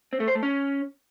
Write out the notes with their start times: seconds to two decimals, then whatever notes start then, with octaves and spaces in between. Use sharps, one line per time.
0.13 C4
0.20 A3
0.28 C5
0.35 A3
0.43 C#4